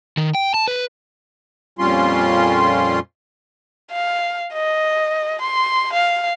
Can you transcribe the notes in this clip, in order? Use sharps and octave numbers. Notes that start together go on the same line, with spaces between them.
D#3
G5
A5
B4
F2 A#2 G3 C#4 F4 C6
F5
D#5
C6
F5